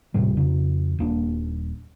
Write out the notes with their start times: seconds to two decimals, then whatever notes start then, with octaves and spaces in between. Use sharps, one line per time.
0.14 D#1 A2 C3 G3
0.37 F2 C#3
0.99 D#1 A#3 D4